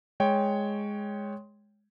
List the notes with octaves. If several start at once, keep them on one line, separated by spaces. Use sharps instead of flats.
G#3 C#5 G5